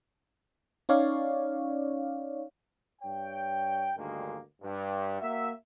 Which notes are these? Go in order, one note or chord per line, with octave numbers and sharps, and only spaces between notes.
C#4 D#4 C#5 D5 F5
G2 C#5 G5
D2 G2 D#3 G#3 A#3
G2
A#3 F#4 E5